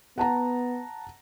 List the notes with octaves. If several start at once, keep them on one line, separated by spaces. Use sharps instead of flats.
B3 F#5 A5 A#5